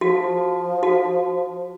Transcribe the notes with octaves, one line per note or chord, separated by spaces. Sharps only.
F3 F#4
F#4